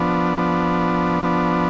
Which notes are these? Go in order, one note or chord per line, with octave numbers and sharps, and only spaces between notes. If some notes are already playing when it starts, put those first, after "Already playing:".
Already playing: F3 B3 D4
F3 B3 D4
F3 B3 D4